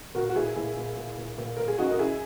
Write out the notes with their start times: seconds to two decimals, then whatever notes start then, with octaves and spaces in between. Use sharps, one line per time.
0.15 A#2 F#4 A#4
0.29 F#4
0.36 A#2 E4 G#4
0.56 A#2 E4 G#4
0.77 A#2
0.97 A#2
1.17 A#2
1.38 A#2
1.57 A#2 A#4
1.68 G#4
1.78 F#2 D#4 F#4
1.91 A#4
1.99 C#3 E4 G#4